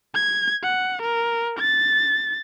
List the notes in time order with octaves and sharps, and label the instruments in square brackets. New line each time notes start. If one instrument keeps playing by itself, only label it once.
[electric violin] G#6
F#5
A#4
A6